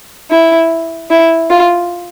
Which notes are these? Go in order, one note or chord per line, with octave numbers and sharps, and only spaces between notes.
E4
E4
F4